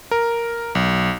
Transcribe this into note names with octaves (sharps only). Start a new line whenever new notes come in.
A#4
B1